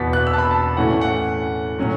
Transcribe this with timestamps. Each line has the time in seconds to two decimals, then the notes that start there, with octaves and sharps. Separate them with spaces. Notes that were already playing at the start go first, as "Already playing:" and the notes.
Already playing: E2 B2 B3 A6 B6
0.13 F#6
0.27 E6
0.34 A5
0.38 B5
0.51 A5
0.77 A2 E3 A3 C#4 F#5
1.01 F#5
1.79 A2 F#3 C#4